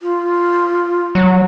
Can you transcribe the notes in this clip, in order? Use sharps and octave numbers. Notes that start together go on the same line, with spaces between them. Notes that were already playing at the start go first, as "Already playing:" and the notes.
F4
F#3